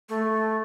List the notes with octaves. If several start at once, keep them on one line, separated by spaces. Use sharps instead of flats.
A3